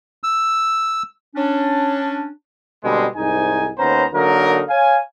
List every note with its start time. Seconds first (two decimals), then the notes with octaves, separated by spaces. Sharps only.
0.24 E6
1.36 C#4 D4
2.84 B2 D3 G3 G#3 C4
3.16 C2 G#2 D#4 G#5
3.78 D#2 B3 C#4 C5 A#5
4.14 D3 F#3 A#3 D#4 A#4
4.69 C#5 F5 G#5